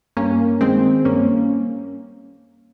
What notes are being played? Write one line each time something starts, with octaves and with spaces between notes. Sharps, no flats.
G2 A#3 C#4
D#3 G#3 C4
G2 A#3 C#4